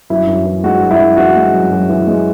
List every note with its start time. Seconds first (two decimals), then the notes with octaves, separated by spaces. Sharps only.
0.10 F#2 E4
0.27 F#2
0.46 E3
0.64 G#3 F#4
0.81 F#2
0.91 E4
1.00 F#2
1.17 E3 F#4
1.36 G#3
1.54 F#2
1.72 F#2
1.89 E3
2.07 G#3